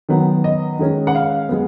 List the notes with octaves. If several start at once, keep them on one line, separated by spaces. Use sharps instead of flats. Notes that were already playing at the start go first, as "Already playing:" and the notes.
D#3 F#3 B3
D#5
D#3 G#3 C#4
F#5
F5
G#3 B3